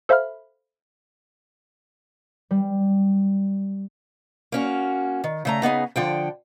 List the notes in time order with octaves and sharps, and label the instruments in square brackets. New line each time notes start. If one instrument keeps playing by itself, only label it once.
[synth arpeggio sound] A4 C5 E5 F5 B5 F6
[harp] G3
[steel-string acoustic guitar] A#3 C#4 F#4
D#3
C#3 A3 A#5
C#3 B3 D#4 G#4
D3 F3 G5